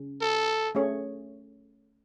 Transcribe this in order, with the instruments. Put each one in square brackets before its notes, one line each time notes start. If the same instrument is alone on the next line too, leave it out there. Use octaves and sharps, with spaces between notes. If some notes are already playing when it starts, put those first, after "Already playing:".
Already playing: [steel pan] C#3
[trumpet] A4
[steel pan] A3 C#4 G#4 C#5